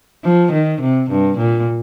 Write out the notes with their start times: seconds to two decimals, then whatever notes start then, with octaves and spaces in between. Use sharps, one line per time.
0.24 F3
0.52 D#3
0.81 C3
1.10 G2
1.38 A#2